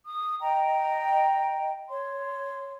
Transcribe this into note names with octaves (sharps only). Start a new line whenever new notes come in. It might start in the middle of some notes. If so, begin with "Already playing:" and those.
D#6
D#5 G5 A#5
C#5 C6